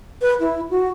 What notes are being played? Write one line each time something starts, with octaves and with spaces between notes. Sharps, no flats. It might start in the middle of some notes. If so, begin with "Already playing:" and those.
B4
E4
F#4